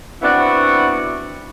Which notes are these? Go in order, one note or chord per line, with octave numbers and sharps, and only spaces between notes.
B3 C4 D4 E4 F#4